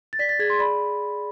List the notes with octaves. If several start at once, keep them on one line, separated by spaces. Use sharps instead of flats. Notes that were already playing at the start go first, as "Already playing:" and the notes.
A6
D5 B6
A6
G#4 G#6
C6
D5 B5